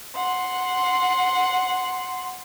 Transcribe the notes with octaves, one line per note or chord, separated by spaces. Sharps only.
F#5 C6